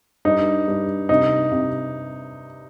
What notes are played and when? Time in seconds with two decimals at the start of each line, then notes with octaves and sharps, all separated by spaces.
0.25 G2 D#4
0.68 G2
1.09 C3 D#4
1.52 C3